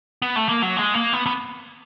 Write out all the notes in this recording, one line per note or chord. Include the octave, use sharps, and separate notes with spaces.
B3
A3
A#3
F#3
G#3
A#3
B3
B3